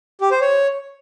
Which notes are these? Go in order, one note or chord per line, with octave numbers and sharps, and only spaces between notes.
G4
C5
C#5